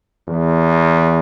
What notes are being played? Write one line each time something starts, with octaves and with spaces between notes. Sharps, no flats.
E2